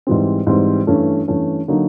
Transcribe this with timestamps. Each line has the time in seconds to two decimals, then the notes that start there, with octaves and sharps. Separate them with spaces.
0.07 G#2 E3 G3 C4
0.47 G#2 E3 G3 C4
0.87 G2 E3 A3 C#4
1.28 G2 E3 A3 C#4
1.68 D3 F#3 A#3 D#4